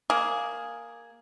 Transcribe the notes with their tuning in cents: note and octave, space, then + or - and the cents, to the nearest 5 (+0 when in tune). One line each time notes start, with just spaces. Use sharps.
A#3 +0 G#4 +0